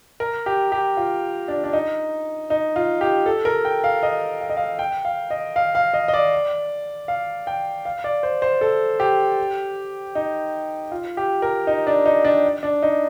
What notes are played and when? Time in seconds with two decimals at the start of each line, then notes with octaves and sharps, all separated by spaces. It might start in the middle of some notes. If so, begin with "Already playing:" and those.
0.20 A#4
0.46 G4
0.72 G4
0.97 F4
1.48 D4
1.64 D4
1.73 D#4
2.50 D#4
2.76 F4
3.01 G4
3.26 A4
3.45 A#4
3.65 G5
3.84 F5
4.03 D#5
4.41 F5
4.49 D#5
4.57 F5
4.79 G5
5.05 F5
5.30 D#5
5.56 F5
5.75 F5
5.93 D#5
6.08 D#5
6.13 D5
7.08 F5
7.47 G5
7.85 F5
8.04 D5
8.23 C5
8.42 C5
8.61 A4
9.00 G4
10.15 D#4
10.91 F4
11.17 G4
11.42 A#4
11.67 D#4
11.87 D4
12.06 D#4
12.24 D4
12.63 D4
12.82 D#4